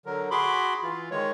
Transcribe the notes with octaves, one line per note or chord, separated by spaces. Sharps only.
D3 F#3 A#4
F#4 G#4 B5 C6 D6
E3 F4
D#3 G#3 C#5